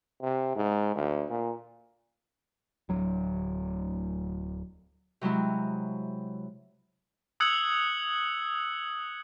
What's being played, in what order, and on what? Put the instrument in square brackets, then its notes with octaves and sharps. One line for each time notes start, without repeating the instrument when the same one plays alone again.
[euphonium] C3
G#2
D2
A#2
[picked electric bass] D1 F#3
[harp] C3 F#3 G#3 E4
[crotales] D#6 E6 F#6 G#6 C#7 F#7